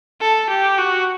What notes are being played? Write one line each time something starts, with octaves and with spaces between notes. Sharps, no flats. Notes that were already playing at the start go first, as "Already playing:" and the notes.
A4
G4
F#4